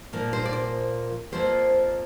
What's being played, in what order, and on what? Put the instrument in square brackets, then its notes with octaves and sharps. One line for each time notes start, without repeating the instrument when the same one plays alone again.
[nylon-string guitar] A#2 F3 A#3
C5
D5
C5
F2 F3 A#3 C5